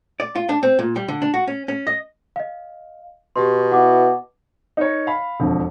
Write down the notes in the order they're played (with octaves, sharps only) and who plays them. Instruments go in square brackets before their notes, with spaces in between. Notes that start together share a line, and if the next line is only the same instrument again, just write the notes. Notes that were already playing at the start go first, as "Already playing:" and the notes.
[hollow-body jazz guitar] D5
F4
D4
C4
A#2
G3
D3
D4
F#4
C#4
C#4
D#5
[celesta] D#5 F5
[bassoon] B2 [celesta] G4 C6
[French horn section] B3 E4 F#4 [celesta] F#5 D6
[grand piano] D#4 A#4 C#5
F5 B5
E1 F2 D3